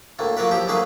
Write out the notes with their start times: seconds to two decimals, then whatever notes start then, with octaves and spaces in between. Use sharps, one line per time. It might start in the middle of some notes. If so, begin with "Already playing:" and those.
0.19 D2 A2 A#3
0.37 F#3 A#3 F4 A#4 B4
0.51 F3 E4 G4
0.67 D3 F#3 A#3 G#4 B4